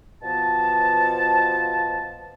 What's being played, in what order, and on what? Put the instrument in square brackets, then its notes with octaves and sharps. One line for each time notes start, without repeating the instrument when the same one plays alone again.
[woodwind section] B2 F3 A5